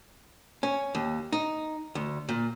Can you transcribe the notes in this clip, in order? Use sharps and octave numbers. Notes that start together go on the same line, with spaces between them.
C#4
D#2
D#4
D2
A#2